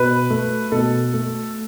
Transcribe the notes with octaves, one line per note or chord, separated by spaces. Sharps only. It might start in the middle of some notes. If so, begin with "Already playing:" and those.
Already playing: B2 B4
A3
B2 A4
A3